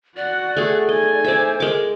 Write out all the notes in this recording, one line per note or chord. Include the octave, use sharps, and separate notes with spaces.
F#4 D5 F#5
A3 G#4
D#4 D#5 G#5
C5 D5 E5
G#3 A#4 D6